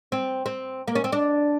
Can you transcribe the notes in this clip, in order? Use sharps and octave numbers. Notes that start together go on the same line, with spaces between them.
C4
C4
A#3
C#4
C4
D4